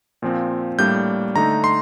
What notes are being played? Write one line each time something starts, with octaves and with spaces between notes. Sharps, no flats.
A#2 F3 C4
A2 G3 A#3 D4 G6
D3 A3 D#4 A#5
C6